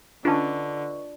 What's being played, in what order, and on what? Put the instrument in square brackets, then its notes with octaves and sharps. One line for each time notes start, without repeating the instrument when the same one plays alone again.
[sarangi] D3 [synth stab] C#4 D4 [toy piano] F4 A5 [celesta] B4 D#5 C#6